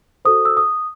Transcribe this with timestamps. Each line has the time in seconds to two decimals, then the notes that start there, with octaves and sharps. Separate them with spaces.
0.25 F#4 A4 C5 D#6
0.45 E6
0.57 D#6